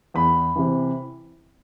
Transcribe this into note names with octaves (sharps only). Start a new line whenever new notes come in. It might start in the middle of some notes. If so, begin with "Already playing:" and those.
E2 B5
C3 E3